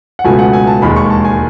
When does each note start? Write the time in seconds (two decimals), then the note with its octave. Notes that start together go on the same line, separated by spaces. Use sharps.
0.19 F#5
0.24 C#2 B2 F#3 A3 G#5
0.39 F#5
0.53 G#5
0.67 A5
0.82 E1 D#2 D#3 G#3 B5
0.96 C#6
1.10 A5
1.25 G#5